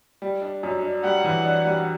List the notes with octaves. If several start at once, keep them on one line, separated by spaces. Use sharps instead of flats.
G3
D4
F#2
D4
G3 F#5
E3
D4
G3